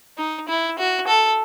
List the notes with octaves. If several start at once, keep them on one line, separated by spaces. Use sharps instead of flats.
D#4
E4
F#4
A4